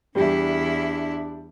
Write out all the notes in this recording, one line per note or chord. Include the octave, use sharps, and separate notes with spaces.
E2 G3 D4 E4